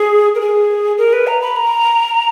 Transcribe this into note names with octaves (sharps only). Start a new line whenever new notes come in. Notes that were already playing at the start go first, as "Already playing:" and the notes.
Already playing: G#4
A#4
G#4
A#4
B4
A#5
B5
A#5